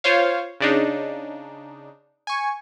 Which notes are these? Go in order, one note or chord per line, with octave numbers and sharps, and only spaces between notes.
F4 C5 C#5 F5
C#3 D4 D#4
G#5 C#6